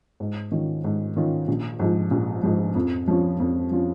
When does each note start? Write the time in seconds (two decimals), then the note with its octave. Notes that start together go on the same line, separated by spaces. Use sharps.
0.20 G#2
0.51 D#3 C#4 F4
0.84 G#2
1.16 D#3 C#4 F4
1.48 A#1
1.79 G#2 F3
2.11 A#1
2.43 G#2 F3
2.75 F2
3.08 F3 C#4 F4
3.40 F2
3.71 F3 C#4 F4